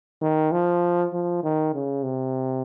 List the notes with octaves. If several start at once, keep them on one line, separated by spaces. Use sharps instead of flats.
D#3
F3
F3
D#3
C#3
C3